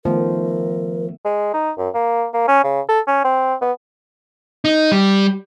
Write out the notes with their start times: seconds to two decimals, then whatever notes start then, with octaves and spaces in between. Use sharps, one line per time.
0.05 D#3 F3 A3 B3 A#4
1.25 G#3
1.54 D#4
1.78 F#2
1.94 A#3
2.34 A#3
2.48 C#4
2.64 C#3
2.89 A4
3.07 C#4
3.25 C4
3.62 B3
4.65 D#4
4.92 G3